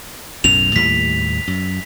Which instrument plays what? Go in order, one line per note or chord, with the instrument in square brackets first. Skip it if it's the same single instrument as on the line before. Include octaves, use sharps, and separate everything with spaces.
[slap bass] B1 F#2 A2 [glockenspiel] F7
[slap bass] D#2 A2 G3 [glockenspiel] B6
[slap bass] F#2